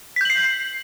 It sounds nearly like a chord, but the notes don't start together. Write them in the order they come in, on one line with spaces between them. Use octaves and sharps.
B6 G6 F#7 C7